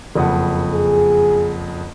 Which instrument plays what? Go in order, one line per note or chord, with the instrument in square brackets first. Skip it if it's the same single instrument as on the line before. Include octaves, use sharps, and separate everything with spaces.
[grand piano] F#1 F2 F#5
[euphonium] G#4